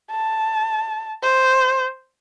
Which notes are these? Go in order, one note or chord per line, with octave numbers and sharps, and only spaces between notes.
A5
C5